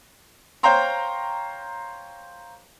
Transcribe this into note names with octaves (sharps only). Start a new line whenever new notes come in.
C5 C#5 F5 G5 A#5 C6